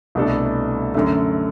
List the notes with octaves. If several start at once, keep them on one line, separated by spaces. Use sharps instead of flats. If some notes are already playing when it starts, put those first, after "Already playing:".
C2 B2 A3 D4 A4
F#2 D3 A3